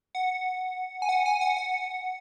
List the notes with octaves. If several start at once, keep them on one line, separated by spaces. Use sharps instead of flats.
F#5
G#5
F#5
G#5
F#5
F#5